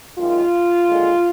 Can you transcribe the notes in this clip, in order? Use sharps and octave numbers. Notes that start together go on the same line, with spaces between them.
F#2 D#3 G#3 F4
D#2 D3 G#3